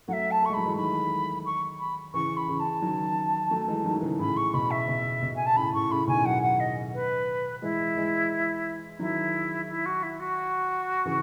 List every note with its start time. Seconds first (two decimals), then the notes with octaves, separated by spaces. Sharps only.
0.08 F#3 A3 E5 F#5
0.31 A5
0.42 A3
0.45 C#6
0.50 G#3
0.53 F#3 B5
0.65 E3 G#3
0.76 D#3 F#3 B5
1.45 C#6
1.79 B5
2.13 C#3 E3 C#6
2.37 B5
2.48 C#3 E3
2.59 A5
2.82 D#3 F#3
3.51 F#3 A3
3.68 E3 G#3
3.84 D#3 F#3
4.02 C#3 E3
4.19 A2 C#3 B5
4.36 C#6
4.54 B2 B5
4.70 E5
4.88 B2
5.22 B2
5.36 G#5
5.46 A5
5.56 A2 C#3 B5
5.73 A2 C#3 C#6
5.90 A2 C#3 B5
6.08 B2 D#3 G#5
6.25 D#3 F#3 F#5
6.42 F#5
6.60 D#5
6.94 B4
7.62 E3 G#3 E4
7.97 E3 G#3
8.99 D#3 F#3 E4
9.68 E4
9.85 F#4
10.02 E4
10.19 F#4
11.05 C#3 E3